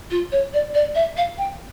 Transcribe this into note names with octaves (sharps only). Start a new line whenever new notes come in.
F4
C#5
D5
D5
E5
F5
G5